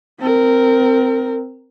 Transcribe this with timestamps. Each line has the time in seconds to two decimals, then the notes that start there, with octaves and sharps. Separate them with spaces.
0.19 C4 A#4